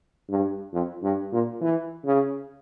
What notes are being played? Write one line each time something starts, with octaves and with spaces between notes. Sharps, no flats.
G2
F2
G2
A#2
E3
C#3